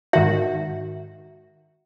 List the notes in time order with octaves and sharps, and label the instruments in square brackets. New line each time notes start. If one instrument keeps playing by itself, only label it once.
[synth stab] G#2 D#3 F#4 [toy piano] E5